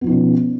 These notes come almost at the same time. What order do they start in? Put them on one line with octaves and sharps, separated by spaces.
B3 F3 D#4 B2 C#4